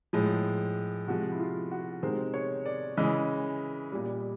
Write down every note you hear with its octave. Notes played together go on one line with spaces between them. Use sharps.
A2 F3 G#3
C3 F3 G#3 F#4
E4
F4
F#4
C3 D#3 G#3 C5
C#5
D5
C#3 E3 G#3 D#5
A#2 G3